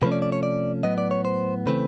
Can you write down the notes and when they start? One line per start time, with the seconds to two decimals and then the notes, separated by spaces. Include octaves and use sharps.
0.02 C3 F3 A3 C#4 B4
0.12 D5
0.22 D5
0.32 C#5
0.43 D5
0.83 A2 F#3 B3 D#5
0.98 D5
1.11 C#5
1.25 C5
1.66 C#3 E3 A3 C4 B4